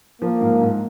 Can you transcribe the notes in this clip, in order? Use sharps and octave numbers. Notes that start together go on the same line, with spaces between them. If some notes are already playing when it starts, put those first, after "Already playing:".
F3 A#3
G#2
G#2